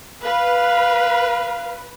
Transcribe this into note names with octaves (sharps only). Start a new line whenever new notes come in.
B4 F5